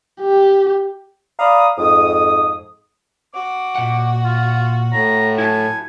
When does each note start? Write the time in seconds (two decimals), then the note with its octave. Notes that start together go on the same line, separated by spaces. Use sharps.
0.21 G4
1.39 D5 F5 A#5 B5 D#6
1.78 F2 G#2 D#6
3.34 F#4 D6
3.75 A#2 F#5
4.24 F4
4.93 A2 A#5
5.38 E4 F#4 G#5 A5